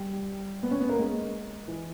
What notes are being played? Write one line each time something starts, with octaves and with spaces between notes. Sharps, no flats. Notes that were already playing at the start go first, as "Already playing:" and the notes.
Already playing: G3
B3
C#4
B3
A#3
G#3
E3